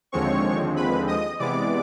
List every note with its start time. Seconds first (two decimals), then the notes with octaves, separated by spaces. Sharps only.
0.12 D#2 D3 F3 G#3 C4 C#5 C#6
0.76 B4 B5
1.08 D#5 D#6
1.39 C3 E3 G#3 B3 D5 D6